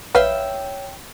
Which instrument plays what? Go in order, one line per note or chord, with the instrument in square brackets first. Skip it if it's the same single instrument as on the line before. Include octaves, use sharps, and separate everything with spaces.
[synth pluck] A#1 F5 F6 [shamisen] B4 [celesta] C#5 [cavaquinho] E5 G5